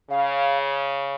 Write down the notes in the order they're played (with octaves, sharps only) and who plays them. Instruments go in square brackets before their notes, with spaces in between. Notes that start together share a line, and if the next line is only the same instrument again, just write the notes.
[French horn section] C#3 [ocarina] F5